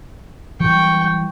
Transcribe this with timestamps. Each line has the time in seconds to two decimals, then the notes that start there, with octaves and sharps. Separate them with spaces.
0.60 E3 F#3 G3 G5 C#6